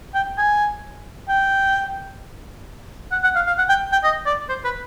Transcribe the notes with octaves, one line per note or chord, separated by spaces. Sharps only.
G5
G#5
G5
F#5
F#5
F5
F5
F#5
G5
G5
D#5
D5
C5
B4